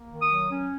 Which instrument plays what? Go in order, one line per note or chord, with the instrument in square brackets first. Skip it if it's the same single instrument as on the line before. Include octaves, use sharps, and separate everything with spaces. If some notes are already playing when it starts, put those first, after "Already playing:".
Already playing: [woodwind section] A#3
D#3
D#6
F#3
C#4